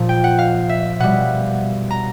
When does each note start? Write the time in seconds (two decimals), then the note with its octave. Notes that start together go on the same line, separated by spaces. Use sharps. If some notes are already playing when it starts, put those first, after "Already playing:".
Already playing: A#2 F3
0.09 G5
0.24 F#5
0.39 F5
0.69 E5
1.00 B2 G3 F#5
1.90 A#5